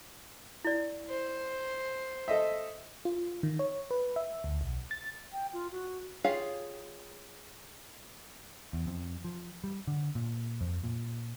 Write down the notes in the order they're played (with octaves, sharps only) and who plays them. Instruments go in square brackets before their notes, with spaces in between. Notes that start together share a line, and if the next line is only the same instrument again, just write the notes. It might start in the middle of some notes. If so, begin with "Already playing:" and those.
[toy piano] E4 D5
[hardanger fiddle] C5
[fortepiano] A4 D#5 E5
[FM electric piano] F4
D#3
C#5
B4
E5
D2
B1
A6
[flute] G5
F4
F#4
[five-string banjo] F4 G4 G#4 C#5 F5
[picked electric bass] E2
F2
F3
G3
D3
A#2
F2
A#2